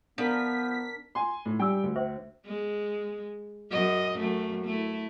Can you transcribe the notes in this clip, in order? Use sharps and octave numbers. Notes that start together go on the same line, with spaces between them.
F3 B3 D4 A#4 B6
G#5 C6
A2
G3 D4 G5 E6
D2
C#4 C5 E5
G#3
F#2 D#5
F#2 A3
A3 E4